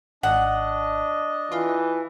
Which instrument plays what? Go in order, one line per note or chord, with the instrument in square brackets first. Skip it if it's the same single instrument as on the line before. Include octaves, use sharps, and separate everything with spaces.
[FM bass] G#1 [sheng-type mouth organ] D4 D#5 [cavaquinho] F#5
[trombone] E3 [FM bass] F4